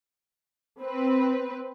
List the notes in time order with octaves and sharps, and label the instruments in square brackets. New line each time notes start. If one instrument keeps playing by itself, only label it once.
[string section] C4 B4